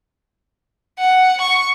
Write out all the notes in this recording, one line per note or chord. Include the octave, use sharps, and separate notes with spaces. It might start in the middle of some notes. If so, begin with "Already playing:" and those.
F#5
C#6